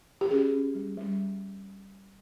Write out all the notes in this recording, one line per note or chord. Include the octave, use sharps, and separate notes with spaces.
G4
C#4 G#4
C#4
G3
G3